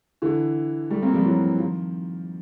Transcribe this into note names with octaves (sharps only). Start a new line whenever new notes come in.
D3 E3
G3 A3
A#3 C4
F3 G3
E3 F#3
D#3 F3